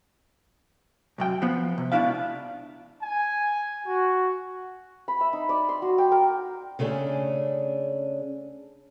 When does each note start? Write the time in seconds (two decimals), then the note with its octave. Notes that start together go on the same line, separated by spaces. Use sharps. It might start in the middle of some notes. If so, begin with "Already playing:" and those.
1.18 C2 F#2 G5
1.42 F3 B3
1.78 C3
1.92 C#2 B2 F#3 D4 E4 F5
3.03 G#5
3.86 F#4
5.08 B5
5.21 E5
5.33 D#4
5.49 D5
5.69 C6
5.82 F#4
5.98 G5
6.12 A#4
6.79 C#3 A3 C#4 D4 G#4